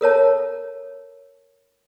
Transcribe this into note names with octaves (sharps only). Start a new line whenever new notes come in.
A4 A#4 C#5 A5